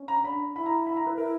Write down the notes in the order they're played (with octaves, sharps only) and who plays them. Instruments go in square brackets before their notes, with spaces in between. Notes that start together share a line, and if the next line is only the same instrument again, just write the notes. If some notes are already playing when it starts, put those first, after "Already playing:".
Already playing: [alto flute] C#4
[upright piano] A#5
[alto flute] D4 [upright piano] B5
[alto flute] D4
[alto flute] E4 [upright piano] B5
[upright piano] A#5
B5
A#5
B4
[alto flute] E4 [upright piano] A#4